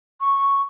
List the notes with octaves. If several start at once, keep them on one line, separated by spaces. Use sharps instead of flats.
C#6